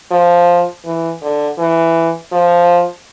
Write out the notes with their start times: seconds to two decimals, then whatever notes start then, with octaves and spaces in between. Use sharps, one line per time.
0.11 F3
0.85 E3
1.22 D3
1.58 E3
2.32 F3